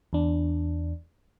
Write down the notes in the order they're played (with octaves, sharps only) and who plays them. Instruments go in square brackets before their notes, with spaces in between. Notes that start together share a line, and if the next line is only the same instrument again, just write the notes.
[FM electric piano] E2 D4